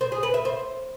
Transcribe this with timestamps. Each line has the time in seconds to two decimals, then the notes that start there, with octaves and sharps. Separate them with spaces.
0.01 C5
0.12 G#4
0.23 B4
0.34 E5
0.45 C5